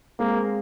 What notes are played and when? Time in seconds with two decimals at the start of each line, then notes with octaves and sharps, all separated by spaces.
0.19 G#3 A#3 C4